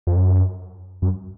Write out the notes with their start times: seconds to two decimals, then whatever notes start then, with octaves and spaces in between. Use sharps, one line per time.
0.07 F2
0.16 F#2
1.02 F#2